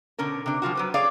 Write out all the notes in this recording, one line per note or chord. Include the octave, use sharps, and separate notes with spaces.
B2 D3 C#4 A#4
C3 D4
F3 G3 F4 F#4
F#3 B4 C5
G#4 C#5 D5 F5